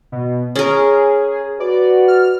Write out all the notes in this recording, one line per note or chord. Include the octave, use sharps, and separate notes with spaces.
B2
C#4 G#4 A#4
F#4 B4 D5
F6